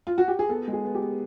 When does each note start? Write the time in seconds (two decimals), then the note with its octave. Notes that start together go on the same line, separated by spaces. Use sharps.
0.07 F4
0.18 F#4
0.28 G4
0.39 G#4
0.49 B3 A4
0.68 G#3
0.73 G#4
0.85 B3
0.95 G4
1.01 B3